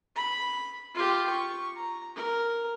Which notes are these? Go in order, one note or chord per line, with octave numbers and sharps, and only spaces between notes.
B5
F4 G4
C#6
A#5
A#4